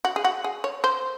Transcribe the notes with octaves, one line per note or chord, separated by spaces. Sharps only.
F#4
G#4
F#4
G#4
C#5
C5